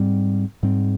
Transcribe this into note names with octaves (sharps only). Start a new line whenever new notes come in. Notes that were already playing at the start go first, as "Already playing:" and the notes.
Already playing: G#2 G3 C4
G#2 G3 C4